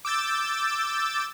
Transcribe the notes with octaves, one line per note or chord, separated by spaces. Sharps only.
D6 E6 G6 A6